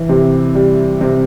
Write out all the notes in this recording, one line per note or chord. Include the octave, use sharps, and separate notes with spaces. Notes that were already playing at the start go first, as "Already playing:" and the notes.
Already playing: E3
C3
G3
C3